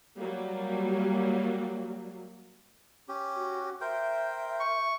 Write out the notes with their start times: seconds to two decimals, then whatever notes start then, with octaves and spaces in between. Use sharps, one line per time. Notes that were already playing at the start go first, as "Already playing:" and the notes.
0.17 F#3 G3 A#3
3.08 C#4 G4
3.35 F#4
3.81 A#4 C5 E5 G5
4.60 C#6